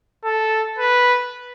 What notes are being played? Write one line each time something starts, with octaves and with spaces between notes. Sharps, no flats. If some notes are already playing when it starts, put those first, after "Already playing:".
A4
B4